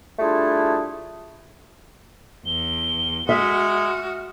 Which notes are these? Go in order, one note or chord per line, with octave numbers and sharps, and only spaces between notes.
G3 A3 D4 E4 F4 G#4
E2 G7
G#3 F#4 E5 F6